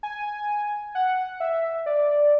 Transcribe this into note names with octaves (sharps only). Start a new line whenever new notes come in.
G#5
F#5
E5
D5